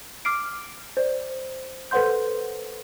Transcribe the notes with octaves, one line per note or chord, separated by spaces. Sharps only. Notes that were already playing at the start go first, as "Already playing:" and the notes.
D6 F6 C7 D7
C5 D5
A4 B4 C5 F#5 C6 G6